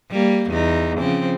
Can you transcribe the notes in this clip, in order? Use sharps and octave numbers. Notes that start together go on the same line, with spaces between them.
G3 A#3
E2 D#4
C#3 F3 C4